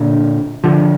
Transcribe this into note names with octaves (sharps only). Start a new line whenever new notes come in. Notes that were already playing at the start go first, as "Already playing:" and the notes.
Already playing: A#2 D3
D3 F3